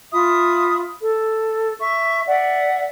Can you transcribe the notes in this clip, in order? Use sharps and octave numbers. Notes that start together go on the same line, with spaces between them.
F4 E5 B5 D#6
A4
E5 C#6
D5 E5 F#5